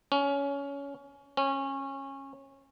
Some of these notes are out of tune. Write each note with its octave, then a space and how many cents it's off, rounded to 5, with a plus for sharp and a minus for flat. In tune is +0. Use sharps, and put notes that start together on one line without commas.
C#4 +20
C#4 -20